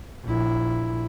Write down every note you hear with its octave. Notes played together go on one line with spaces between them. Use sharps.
A#1 E4